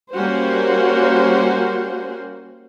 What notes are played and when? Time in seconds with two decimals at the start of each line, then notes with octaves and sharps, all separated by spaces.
0.15 G3 A#3 C#4 F#4 C5